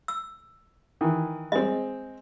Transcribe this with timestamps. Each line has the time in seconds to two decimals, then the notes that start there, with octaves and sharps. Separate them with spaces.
0.08 E6
1.01 D#3 E3
1.52 G#3 C4 D#5